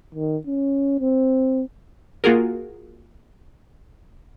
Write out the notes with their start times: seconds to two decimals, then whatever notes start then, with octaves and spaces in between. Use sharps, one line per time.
0.15 D#3
0.47 C#4
1.01 C4
2.24 A#3 F4 F#4 G#4 A#4